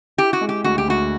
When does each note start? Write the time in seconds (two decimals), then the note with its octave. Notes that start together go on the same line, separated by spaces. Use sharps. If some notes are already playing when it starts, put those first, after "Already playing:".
0.18 E4 G4
0.33 F#4
0.41 G#3
0.49 G4
0.64 D2 F#4
0.78 G4
0.88 D2 F#4